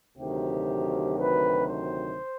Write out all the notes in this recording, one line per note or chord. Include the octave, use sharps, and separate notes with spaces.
D2 C3 D#3 F#3 G4
B4
C5